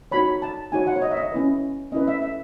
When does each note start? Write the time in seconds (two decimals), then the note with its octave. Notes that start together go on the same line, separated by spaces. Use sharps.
0.12 D#4 F#4 C#5 B5
0.42 A5
0.72 D#4 F#4 C#5 G#5
0.87 F#5
0.96 C#5
1.02 D#5
1.11 E5
1.17 D#5
1.32 C#4 E4 B4
1.92 C#4 E4 B4 D#5
2.08 E5
2.22 E5